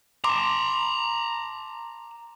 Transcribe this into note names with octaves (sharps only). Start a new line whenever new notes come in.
A5 A#5 C6 D6